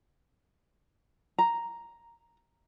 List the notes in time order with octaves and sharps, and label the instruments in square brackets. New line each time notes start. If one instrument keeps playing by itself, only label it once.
[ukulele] A#5